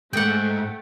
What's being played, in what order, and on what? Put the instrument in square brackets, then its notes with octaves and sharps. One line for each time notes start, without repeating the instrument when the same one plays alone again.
[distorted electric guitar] G#2 [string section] A3 [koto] F#5 G5